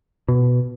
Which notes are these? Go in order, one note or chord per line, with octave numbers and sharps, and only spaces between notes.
B2